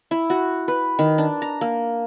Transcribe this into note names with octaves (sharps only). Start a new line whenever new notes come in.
E4
F#4
B4
D#3
D4
A#5
A#3